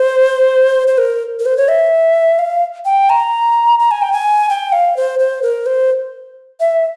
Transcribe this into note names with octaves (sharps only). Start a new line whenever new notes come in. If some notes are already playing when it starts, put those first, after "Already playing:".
Already playing: C5
C5
A#4
A#4
C5
C#5
E5
F5
G5
A#5
A#5
G#5
G5
G#5
G5
F5
C5
C5
A#4
C5
E5